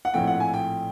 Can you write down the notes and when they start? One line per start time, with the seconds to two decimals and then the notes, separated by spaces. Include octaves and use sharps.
0.05 F#5
0.13 A#1 A2 F3 A3 C4 G5
0.27 F#5
0.40 G#5
0.54 G5